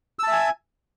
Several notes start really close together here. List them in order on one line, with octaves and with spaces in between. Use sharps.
E6 A5 E5 G#5